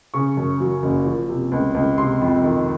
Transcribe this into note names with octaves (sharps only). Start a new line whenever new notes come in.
C#3 C#6
F#2
F#3
F#1
F3
C3
C#2
C#2
C3 C6
F2
D#3